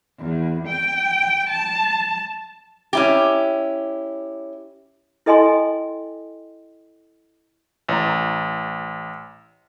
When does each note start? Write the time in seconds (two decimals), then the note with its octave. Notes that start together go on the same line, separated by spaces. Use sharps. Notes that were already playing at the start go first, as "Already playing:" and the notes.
0.19 E2
0.67 G5
1.49 A5
2.93 C#4 E4 G4
5.26 E4 A4 D#5 G5 G#5 C6
7.89 A1 A#5